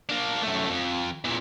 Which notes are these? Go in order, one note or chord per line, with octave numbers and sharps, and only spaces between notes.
A#3 D4
F#2 A3
F2
E2 A#2